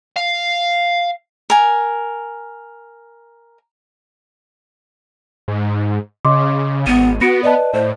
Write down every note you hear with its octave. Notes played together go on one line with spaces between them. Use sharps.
F5
A#4 G#5
G#2
C#3 D#5 C6 D6
G#1 B3 D#7
B3 F#4 A#6 C#7 D7
B4 D5 D#5 A5
A2 C5